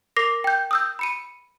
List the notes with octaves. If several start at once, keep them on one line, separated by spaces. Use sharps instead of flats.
A#4 D6 A#6 C7 F7
G5 G6
D#6 E6 G6
B5 C#7 D#7